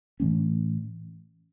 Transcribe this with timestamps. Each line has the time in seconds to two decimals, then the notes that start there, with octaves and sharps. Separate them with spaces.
0.20 A2 E3 A3 C#4